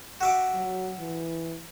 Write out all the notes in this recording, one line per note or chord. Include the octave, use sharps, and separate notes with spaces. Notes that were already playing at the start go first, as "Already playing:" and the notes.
F#4 E5 D6
F#3
E3